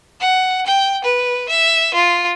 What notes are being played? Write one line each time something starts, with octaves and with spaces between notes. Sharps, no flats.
F#5
G5
B4
E5
F4